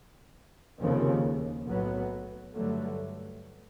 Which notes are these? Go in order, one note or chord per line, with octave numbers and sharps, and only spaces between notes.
F1 D#2 C#3 F3
B1 A2 F#3 B3
G2 D3 F#3 A3